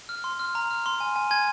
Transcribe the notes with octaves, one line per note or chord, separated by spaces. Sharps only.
F6
C6
F6
A#5
F6
C6
G#5
G#5
G#5 G#6